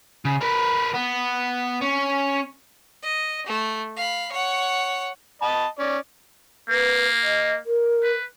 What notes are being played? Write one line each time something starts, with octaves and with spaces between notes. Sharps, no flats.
C#3
A#4 B4
B3
C#4
D#5
A3
F5 B5
C#5 F#5
D#5 A5 B5
C#4 D5
A#3 B4
D#5
A#4
B4